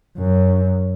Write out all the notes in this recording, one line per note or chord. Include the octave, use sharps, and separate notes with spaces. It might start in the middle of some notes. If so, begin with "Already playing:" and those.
F#2